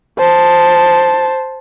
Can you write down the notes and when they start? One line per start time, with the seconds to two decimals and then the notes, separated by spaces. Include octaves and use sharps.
0.18 C5 A5